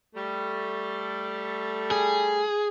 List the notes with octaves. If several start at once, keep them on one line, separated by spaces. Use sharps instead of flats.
G3 A3
G#4